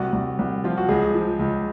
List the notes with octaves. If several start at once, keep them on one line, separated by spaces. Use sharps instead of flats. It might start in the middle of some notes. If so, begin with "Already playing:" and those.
Already playing: C2 F#4
C2
C2
F3 F4
F#4
C#2 G#4
F3
C#2